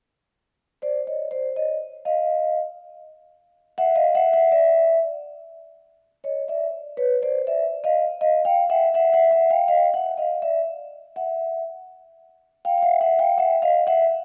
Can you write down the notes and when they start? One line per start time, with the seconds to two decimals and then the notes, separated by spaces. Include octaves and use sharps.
0.82 C5 D5
1.07 C#5 D#5
1.31 C5 D5
1.56 C#5 D#5
2.05 D#5 F5
3.78 E5 F#5
3.96 D#5 F5
4.15 E5 F#5
4.33 E5 F#5
4.51 D5 E5
6.24 C#5 D#5
6.48 D5 E5
6.97 B4 C#5
7.22 C5 D5
7.47 D5 E5
7.84 D#5 F5
8.21 D#5 F5
8.45 F5 G5
8.70 E5 F#5
8.94 E5 F#5
9.13 E5 F#5
9.31 E5 F#5
9.50 F5 G5
9.68 D#5 F5
9.94 E5 F#5
10.17 D#5 F5
10.42 D5 E5
11.16 E5 F#5
12.65 F5 G5
12.78 F5
12.83 E5 F#5
13.01 E5 F#5
13.19 F5 G5
13.38 E5 F#5
13.62 D#5 F5
13.87 E5 F#5